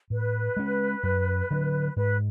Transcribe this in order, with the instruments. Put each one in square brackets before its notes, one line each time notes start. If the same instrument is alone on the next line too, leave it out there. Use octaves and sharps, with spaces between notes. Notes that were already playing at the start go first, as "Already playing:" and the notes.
[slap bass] A2 [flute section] B4
[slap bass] G#3 C#4
F#2
D3 F#3
[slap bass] G#2 [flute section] B4